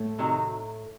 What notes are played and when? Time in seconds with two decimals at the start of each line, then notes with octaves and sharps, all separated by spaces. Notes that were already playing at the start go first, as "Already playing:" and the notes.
Already playing: A2 A3
0.18 C3 D#3 F#3